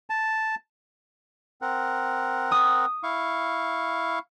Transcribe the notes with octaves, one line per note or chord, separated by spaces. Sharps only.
A5
C4 A#4 F#5
D#6
E4 F5 C#6